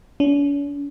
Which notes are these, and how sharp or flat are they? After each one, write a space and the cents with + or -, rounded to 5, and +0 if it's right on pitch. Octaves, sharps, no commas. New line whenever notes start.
C#4 +45